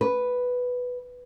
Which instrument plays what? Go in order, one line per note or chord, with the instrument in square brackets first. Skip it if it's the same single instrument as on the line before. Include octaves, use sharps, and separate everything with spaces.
[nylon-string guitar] B4